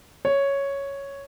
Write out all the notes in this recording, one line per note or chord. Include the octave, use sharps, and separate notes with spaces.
C#5